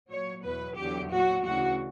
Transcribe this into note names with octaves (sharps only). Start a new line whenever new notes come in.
A#2 F#3 C#5
E2 B2 F#3 B4
E2 D3 F#3 G4
A#2 F#3 F#4
D2 C#3 E3 F#4